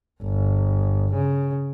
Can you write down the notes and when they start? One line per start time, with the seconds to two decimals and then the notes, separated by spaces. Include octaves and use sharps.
0.23 G1
1.14 C#3